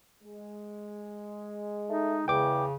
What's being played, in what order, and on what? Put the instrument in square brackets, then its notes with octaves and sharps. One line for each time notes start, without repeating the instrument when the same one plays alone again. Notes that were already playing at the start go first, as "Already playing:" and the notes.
[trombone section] G#3
[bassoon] A3 [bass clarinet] D#4
[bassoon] E2 [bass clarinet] C#3 [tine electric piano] G5 D6